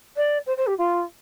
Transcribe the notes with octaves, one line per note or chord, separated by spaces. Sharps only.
D5
C5
C5
G4
F4